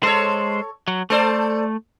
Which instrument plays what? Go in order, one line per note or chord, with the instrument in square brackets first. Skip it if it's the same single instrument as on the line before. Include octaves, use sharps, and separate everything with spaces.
[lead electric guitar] G#3 C5 [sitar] A4 C#5
[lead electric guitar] F#3
[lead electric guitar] A3 [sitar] A4 C5 D5